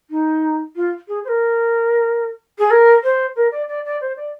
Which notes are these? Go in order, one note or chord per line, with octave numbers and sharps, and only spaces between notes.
D#4
F4
G#4
C5
A#4
G#4
A#4
C5
A#4
D5
D5
D5
C5
D5